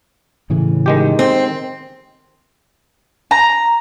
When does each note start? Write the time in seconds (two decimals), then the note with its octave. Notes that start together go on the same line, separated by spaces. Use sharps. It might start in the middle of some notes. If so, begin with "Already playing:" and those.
0.50 A2 C#3 E3
0.86 D#3 G#3 G4
1.19 C4
3.31 A#5